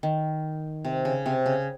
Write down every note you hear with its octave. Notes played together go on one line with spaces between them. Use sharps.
D#3
C3
C#3
C3
C#3